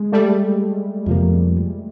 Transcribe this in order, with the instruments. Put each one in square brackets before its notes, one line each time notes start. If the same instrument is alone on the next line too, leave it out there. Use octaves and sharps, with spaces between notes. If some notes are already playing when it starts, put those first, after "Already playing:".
Already playing: [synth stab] G#3
G3 A3
[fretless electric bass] F2 C3 F3 A#3